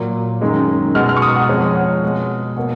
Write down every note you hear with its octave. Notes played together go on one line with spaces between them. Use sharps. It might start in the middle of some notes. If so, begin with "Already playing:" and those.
Already playing: A#2 F#3 A#3
F#2 D#3 G#3
B2 G#3 F6
F6
C#6
D#6
F#5
F2 F3 G#3 C#5
F#5
B2 G#3
B2 A#3